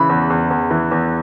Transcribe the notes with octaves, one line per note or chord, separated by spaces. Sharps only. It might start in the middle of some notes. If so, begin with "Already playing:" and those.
Already playing: C#3 E3 B5
E2
E2
E2
E3
E2